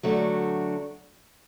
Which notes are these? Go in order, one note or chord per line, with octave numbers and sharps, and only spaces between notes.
D3 F#3 A3 D4 F#4